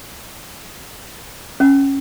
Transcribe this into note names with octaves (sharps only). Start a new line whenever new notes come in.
C#4